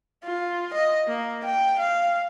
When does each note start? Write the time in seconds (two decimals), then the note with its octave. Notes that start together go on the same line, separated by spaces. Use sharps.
0.24 F4
0.74 D#5
1.07 A#3
1.45 G5
1.79 F5